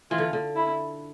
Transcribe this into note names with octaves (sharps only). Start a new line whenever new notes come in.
E3 F4
D3
D3
E4